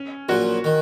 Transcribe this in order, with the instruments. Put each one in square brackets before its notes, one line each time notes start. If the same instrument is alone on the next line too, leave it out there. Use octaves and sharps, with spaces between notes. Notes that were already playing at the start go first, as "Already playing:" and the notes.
Already playing: [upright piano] C#4
[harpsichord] A#1 A#2 F#3 [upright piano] F#4
[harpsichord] D#3